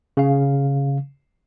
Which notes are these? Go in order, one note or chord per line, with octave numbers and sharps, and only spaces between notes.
C#3 F5